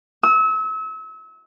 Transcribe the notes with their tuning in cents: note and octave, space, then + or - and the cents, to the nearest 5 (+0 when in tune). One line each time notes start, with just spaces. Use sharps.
E6 -35